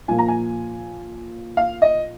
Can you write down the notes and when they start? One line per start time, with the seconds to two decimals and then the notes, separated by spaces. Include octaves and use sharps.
0.08 A#2 F3 A#3 G#5
0.19 A#5
0.28 G#5
1.57 F5
1.82 D#5